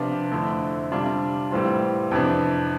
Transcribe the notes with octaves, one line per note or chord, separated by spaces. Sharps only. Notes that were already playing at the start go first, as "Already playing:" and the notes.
Already playing: C3 F3 B3 D4 F4
F2 D3 A3 C4 E4
C3 G3 D4 F4
A2 E3 G3 C4 F4
F2 C3 E3 B3 D4